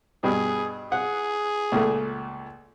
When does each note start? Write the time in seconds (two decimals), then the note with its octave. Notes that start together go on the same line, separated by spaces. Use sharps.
0.23 G2 B2 G#4
0.92 G#4 F#5
1.72 C#2 A#2 A3